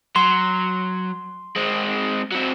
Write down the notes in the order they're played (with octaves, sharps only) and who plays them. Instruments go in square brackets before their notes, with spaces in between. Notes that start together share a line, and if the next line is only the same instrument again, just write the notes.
[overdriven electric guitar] F#3 [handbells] C6
[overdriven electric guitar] G#3 C4
F#3 C4